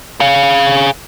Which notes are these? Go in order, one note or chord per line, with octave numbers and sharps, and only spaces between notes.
G#4 F5